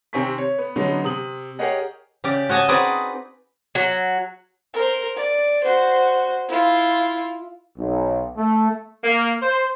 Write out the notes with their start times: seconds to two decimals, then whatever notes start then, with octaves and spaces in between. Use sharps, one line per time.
0.13 C3 D#3 C4 G#5 C#6 B6
0.38 C#5
0.58 B3
0.76 D3 F#3 G#3 B3 C#4 D#4
1.04 C3 D#6 F#7
1.59 G4 G#4 A#4 C#5 D#5 F#5
2.24 C#3 G4 D5
2.49 F#4 C#5 D#5 G#5 A5
2.68 C4 D#4 F#4 G#4 B4 D5
3.75 F#3
4.74 A#4 C5
5.17 D5
5.63 F#4 C5
6.48 E4 F4
7.78 B1
8.37 A3
9.03 A#3
9.42 C5